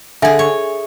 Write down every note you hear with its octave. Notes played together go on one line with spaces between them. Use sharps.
D3 G#4 E5 G#5
C#5